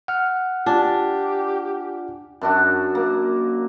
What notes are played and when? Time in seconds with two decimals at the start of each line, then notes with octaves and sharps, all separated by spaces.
0.08 F#5 F6
0.66 D4 F4 G4 D5 G#5
2.41 F#2 D4 F#4
2.95 A#3